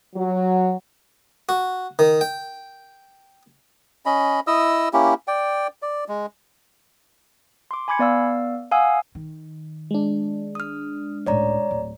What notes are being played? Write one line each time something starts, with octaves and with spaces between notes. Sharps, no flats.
F#3
F#4
D#3
G5
C#4 D#5 B5
E4 D#5 D#6 E6
A#3 C#4 E4 G4
D5 G5
D5
G#3
C6 D6
G#5 B5 D6 G#6 C#7
B3 D5 F5 E6
F5 F#5 G#5 D#6 E6
D#3
G#3 D4
D#6 F6
C#2 A2 C#5 D5 A#5
D1